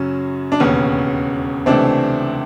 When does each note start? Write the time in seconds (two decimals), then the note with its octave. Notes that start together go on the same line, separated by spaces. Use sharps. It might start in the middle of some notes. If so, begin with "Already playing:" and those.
Already playing: F#2 C#3 F#3 C#4
0.52 D4
0.60 E1 D#2 C#3 B3 C#4
1.66 C#2 C3 E3 A3 C4 D4